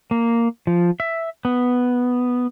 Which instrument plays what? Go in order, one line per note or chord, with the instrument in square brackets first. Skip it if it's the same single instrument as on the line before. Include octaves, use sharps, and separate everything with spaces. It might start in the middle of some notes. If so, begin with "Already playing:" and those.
[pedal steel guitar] A#3
F3
E5
B3